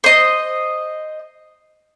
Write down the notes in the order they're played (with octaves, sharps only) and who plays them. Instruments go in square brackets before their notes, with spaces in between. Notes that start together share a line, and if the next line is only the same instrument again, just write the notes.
[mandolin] C5 D#5